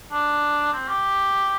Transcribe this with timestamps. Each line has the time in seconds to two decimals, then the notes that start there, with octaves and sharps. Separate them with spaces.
0.11 D4
0.73 C4
0.88 G4